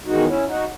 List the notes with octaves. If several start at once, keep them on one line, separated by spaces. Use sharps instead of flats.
E2 D#3 G#3 D#4 F#4
C#4 E4
D#4 F#4